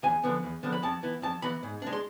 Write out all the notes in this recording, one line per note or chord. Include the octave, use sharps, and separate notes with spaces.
E2 G#5
D3 F3 B3
E2
D3 F3 B3
B5
F2 A5
E3 B3
F2 A5
E3 B3 B5
G#2
G#3 D4
C6